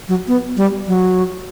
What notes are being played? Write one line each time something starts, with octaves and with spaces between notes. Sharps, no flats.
F#3
B3
G3
F#3